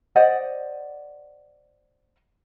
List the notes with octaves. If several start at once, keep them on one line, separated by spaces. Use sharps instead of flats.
C5 D5 D#5 F#5